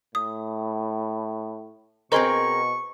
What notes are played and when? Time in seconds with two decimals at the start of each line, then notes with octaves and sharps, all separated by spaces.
0.15 A2 D#6
2.12 B2 C4 G#4 A#4 C5 D#5 C6 C#6